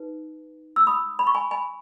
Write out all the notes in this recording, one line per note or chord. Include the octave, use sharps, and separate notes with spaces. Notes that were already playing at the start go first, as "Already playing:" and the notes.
Already playing: D#4 B4
E6
B5 D#6
B5
C#6
G#5 B5
G#5 B5